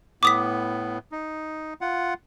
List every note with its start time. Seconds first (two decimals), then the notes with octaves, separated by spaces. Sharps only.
0.23 A2 B3 D6 D#6 B6
1.12 D#4
1.81 F4 F#5